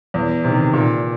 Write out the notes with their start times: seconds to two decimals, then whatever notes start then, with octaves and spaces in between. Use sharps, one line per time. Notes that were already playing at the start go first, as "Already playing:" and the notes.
0.14 E2
0.44 C3 D#3
0.73 A#2